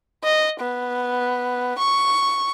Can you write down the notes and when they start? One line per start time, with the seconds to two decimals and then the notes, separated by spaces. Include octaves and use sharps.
0.24 D#5
0.61 B3
1.78 C#6